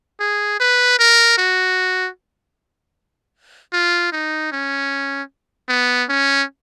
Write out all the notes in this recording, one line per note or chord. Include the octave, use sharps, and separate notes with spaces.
G#4
B4
A#4
F#4
F4
D#4
C#4
B3
C#4